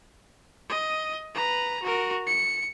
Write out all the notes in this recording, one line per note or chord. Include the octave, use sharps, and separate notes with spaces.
D#5
B4 A#5
F#4 A#4
C#7